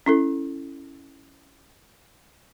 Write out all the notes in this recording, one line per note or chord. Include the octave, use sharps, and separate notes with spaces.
C#4 E4 A4